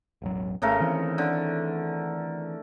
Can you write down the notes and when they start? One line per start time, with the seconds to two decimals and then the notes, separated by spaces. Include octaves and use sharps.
0.22 E1 A1 F#3
0.62 G#1 C#3 A3 A#4
0.80 D#3 E3 C4
1.18 D3